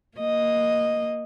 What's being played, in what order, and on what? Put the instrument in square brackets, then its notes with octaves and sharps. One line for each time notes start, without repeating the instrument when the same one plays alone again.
[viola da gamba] A#3 D#5